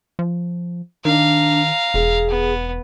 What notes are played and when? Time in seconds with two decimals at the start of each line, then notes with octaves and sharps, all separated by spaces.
0.19 F3
1.05 D#3 D4 F5 A#5
1.94 E1 G#4
2.30 B3